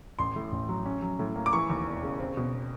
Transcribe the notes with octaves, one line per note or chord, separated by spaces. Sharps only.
A1 C6
A2
A1
F#3
C#4
F#3
A2
A#3
D6
E3 C#6
D#2
E1
C#3
C4
B2